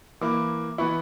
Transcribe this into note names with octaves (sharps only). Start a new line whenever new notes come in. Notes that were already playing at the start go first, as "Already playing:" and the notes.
E3 A#3 E4 D6
E3 B3 E4 C#6